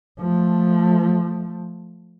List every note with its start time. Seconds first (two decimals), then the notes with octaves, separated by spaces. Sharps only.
0.20 F3 A3